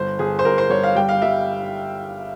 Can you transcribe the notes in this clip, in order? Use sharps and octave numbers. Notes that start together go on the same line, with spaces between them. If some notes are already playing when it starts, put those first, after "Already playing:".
Already playing: G1 C5
G1 G#4
C5
G1 A#4
C5
G1 C#5
F5
G3 G5
F5
G3 E5